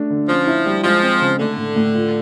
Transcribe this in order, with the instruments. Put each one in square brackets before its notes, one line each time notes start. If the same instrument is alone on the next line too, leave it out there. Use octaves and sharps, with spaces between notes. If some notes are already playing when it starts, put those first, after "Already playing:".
Already playing: [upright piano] A3 D4
D3
[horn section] F3 [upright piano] C#4
[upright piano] E4
G3
[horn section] F3 [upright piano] G#3
[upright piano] C4
C#3
[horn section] D3 [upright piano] A3
[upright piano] A2
A2
F4